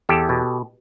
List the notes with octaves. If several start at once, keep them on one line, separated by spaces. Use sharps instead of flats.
E2 G4 A4
B2